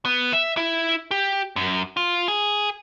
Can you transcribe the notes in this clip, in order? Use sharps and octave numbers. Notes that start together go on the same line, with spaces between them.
B3
E5
E4
G4
F#2
F4
G#4